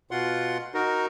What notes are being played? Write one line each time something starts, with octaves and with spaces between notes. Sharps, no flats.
B2 F4 F#5 C6
D#4 F#4 A#4